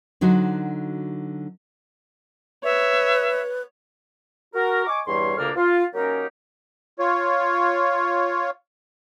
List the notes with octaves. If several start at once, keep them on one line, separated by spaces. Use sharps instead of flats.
D3 F#3 D#4 F#4 C5
B4 C#5 E5
F#4 A#4
D#5 G#5 C#6 D6
E2 G2 G3 C#5 C6
D2 A#2 C#3 A#3 D4 F6
F4
F#3 A#3 C#4 D#4 G4 A#4
F4 C#5